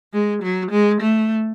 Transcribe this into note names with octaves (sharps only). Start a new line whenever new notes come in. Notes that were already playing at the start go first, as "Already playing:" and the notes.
G#3
F#3
G#3
A3